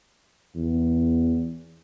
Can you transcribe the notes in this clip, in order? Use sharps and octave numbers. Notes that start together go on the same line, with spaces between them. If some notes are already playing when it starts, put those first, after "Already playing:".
E2